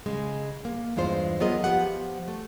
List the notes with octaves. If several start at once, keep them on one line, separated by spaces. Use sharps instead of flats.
C#3 G#3
A#3
E2 G2 G#3 F4 C5
F#3 B3 F4 G#4 A#4 D#5
F3 B3 G4 F#5
A3